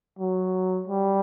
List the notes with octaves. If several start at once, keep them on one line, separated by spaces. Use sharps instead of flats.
F#3
G3